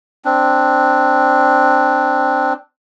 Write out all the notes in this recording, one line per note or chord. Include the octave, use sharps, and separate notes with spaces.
C4 D4